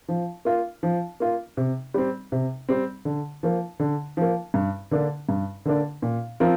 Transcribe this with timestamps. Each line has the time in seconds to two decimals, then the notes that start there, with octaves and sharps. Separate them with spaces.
0.09 F3
0.45 A#3 F4
0.83 F3
1.20 A#3 F4
1.57 C3
1.94 G3 C4
2.32 C3
2.69 G3 C4
3.05 D3
3.43 F3 A#3
3.80 D3
4.17 F3 A#3
4.54 G2
4.91 D3 A#3 D4
5.29 G2
5.65 D3 A#3 D4
6.02 A#2
6.40 F3 C4 F4 A#4